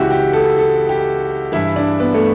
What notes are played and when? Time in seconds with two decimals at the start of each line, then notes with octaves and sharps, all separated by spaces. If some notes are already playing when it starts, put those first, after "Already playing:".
Already playing: C#2 C#3 E3 E4 F#4 G4
0.10 G4
0.33 A4
0.58 A4
0.89 G4
1.52 G2 E3 E4
1.76 D4
2.00 B3
2.14 A3